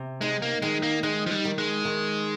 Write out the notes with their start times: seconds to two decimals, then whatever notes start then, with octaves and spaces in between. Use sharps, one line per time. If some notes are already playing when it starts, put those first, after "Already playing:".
Already playing: C3
0.21 G#3 D#4
0.42 A#3
0.62 D#3 G#3
0.83 A#3
1.03 G#3 D#4
1.26 F3
1.31 G3
1.45 D#3
1.58 G#3
1.85 D#3